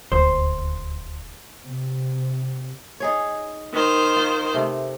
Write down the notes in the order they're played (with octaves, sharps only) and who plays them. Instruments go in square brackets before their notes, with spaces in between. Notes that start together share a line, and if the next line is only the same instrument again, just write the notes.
[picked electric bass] D#1 D2 [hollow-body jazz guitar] C5
[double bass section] C3
[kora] D#4 G#4 C#5
[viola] D#3 C5
[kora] F4
C3 A3